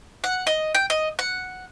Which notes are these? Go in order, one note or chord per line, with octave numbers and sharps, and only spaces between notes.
F#5
D#5
G5
D#5
F#5